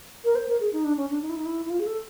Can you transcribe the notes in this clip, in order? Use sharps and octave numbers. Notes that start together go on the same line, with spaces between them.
A#4
C5
A#4
G#4
D#4
D4
C#4
D4
D#4
E4
D#4
E4
E4
F4
G#4
A4